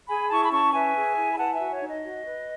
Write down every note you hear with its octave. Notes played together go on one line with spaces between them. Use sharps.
G#4 G#5 B5
E4 A5 C#6
B5
C#4 A5 C#6
B4 E5 G#5
G#4
E4
B5
B4 F#5 A5
E5 G#5
F#4
C#5
D#4
D#5
F#4
B4